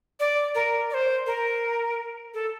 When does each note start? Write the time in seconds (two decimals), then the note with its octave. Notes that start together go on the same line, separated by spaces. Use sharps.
0.20 D5
0.55 A#4
0.90 D5
0.94 C5
1.26 A#4
2.34 A4